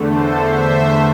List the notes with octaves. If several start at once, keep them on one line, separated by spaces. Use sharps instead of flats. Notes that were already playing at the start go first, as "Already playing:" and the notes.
Already playing: E2 D3 A3
A4 C5
C5 E5